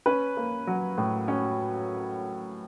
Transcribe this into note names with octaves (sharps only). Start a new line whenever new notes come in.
C#4 B4
A#3
F#3
A2
C#4